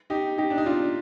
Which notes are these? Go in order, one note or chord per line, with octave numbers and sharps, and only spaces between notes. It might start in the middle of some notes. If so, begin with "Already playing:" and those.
D#4 G4
D#4 G4
D4
D#4
D4 F4